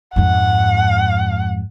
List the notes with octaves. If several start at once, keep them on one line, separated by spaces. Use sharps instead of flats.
F2 G#2 F#5